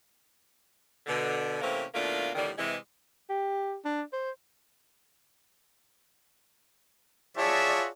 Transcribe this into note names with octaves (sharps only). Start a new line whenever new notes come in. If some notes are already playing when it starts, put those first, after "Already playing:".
B2 D3
C3 E3 A3 A#3 C4 C#4
B2 D#3 A3 A#3 D4 F4
F2 A2 D3 D#3 G3
C3 E3 G#3
G4
D4
C5
F4 F#4 G#4 C#5 D5 E5 A5